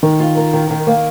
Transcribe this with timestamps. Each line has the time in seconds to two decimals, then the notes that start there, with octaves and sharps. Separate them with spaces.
0.03 D#3 A#4
0.20 F4
0.37 A#4
0.53 D#3
0.70 D#3
0.87 A#3